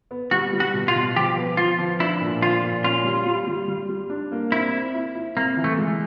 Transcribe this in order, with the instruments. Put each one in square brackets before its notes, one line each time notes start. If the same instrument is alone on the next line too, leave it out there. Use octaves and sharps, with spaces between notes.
[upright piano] B3
[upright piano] G3 [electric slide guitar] F#4
[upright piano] G3
[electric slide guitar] F#4
[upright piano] B2
[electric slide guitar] F4
[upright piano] B2
[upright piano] F3 [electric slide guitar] G4
[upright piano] B3
[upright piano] F3 [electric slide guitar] F4
[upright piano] F3
[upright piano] D4 [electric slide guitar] E4
[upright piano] A#2
[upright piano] F3 [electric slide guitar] F4
[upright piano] A#2
[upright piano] C#4 [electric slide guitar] F4
[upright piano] G3
G3
G3
G3
G3
D4
A#3
[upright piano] C4 [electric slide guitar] E4
[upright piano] C4
E4
E4
[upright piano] C3 [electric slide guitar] A#3
[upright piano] E3
[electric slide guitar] A3
[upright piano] G#3